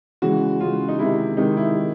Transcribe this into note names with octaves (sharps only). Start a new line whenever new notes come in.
C#3 E3 G#3 F#4
C#3 E3 G#3 F4
D#4
C3 D#3 G#3 E4
C3 D#3 G#3 D#4
E4
D#3 G#3